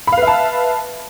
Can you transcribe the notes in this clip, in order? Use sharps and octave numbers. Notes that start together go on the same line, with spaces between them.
B4 E5 F5 A5 B5